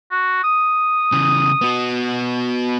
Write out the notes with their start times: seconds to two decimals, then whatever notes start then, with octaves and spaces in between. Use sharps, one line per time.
0.11 F#4
0.44 D#6
1.12 C#3 E3
1.61 B3 F#4